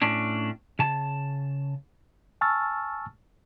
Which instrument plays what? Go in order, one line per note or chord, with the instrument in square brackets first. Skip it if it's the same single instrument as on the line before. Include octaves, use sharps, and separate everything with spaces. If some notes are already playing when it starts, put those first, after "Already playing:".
[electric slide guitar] A2 C#4 D4
C#3 A5
[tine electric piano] G#5 A5 C#6 E6 F6 A6